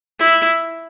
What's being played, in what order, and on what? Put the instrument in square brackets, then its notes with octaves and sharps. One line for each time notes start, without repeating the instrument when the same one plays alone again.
[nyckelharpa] E4